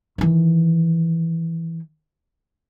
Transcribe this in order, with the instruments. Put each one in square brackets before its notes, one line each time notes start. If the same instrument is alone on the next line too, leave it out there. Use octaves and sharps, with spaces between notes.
[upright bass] D#3 E3